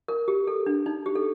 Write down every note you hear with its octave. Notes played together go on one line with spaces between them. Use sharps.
A#4
G4
A4
D4
D#4
G4
A4